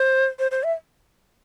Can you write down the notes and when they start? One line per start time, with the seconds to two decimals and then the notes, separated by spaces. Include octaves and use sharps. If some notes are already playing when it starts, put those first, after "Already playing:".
Already playing: C5
0.39 C5
0.51 C5
0.63 E5